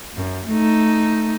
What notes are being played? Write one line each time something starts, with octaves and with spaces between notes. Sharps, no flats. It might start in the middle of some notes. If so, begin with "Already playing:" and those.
F#2
A3 D#4